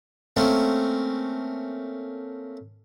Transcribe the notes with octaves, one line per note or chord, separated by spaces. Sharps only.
A3 A#3 C4 C#4